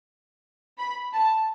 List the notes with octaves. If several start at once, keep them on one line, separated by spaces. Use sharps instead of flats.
B5
A5